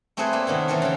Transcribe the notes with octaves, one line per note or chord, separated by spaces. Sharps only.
A3 C4 E4 G#4 A4 B4
G3 A#3
C3 D#3 B3 C#4
E3 F#3 F4 A4 A#4
C#3 F5 G5